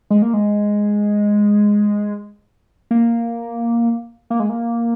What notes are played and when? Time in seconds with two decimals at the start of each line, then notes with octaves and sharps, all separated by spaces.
0.10 G#3
0.22 A#3
0.34 G#3
2.91 A#3
4.30 A#3
4.40 G#3
4.50 A#3